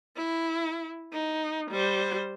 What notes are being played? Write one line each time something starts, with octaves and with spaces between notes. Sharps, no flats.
E4
D#4
G3 C5